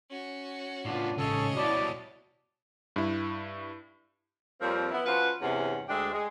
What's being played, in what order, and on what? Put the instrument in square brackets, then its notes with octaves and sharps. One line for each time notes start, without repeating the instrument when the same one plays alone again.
[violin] C#4 F#4
[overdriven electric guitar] A2 B3 [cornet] D4 [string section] F4
[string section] A1 G#2 [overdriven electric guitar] C#3 [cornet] A4 [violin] C#5 D#5
[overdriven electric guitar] B2 G3 [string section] E4 F#4 A5 [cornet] D5
[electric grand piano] G2 E4
[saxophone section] F2 F3 G3 A#3 C4 C#5
B3 E4
F3 C#4 F#4 B4 C5 F5
E2 G2 C3 C#4 F#5
D2 G#3 D4 G4 G#4 E5
G#3